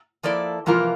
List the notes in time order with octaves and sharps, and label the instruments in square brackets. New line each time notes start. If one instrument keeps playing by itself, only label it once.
[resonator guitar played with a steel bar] F3 A#3 E4 A4 D5
[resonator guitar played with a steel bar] C3 E3 A#3 F4 A#4 [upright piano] F3